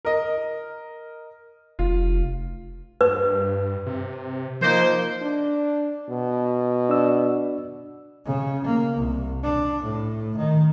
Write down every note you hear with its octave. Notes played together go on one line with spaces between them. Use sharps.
A#4 D#5
F1 F4
G2 B4
C3
F3 A#3 D#4 C5
D4
B2
D4 D5 E6
C#3
A#3
C2
D4
A2
D#3